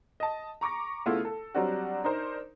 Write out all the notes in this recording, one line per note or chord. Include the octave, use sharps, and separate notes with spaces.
D#5 A5
A#5 C#6 D6 A#6
C#3 A3 B3 E4 F4
A4
F#3 G3 C4 D4 F#4
D4 D#4 A#4 C5